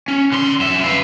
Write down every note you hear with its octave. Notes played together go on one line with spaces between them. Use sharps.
C#4
D3 C6
F#2 E5
F4 B4